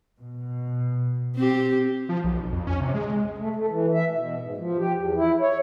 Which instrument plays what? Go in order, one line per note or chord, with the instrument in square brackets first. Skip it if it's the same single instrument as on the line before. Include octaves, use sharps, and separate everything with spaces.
[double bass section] B2
[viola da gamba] C4 G4
[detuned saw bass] F3
B1
F2
C#4
C3
G#3
[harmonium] A3
A3
E3
E5
B2
G#2
F3
G4
E2
E4
C#5